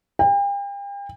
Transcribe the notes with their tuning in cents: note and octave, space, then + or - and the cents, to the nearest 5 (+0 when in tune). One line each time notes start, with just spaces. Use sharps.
G5 +40